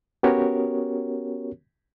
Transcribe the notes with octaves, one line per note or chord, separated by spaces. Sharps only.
B3 C#4 F#4 G4 A#4 C#5